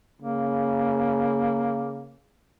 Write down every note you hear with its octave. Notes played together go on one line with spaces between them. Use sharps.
C#3 A#3